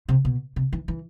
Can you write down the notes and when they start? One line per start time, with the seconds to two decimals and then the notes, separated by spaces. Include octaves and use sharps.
0.09 C3
0.25 B2
0.56 C3
0.73 E3
0.88 E3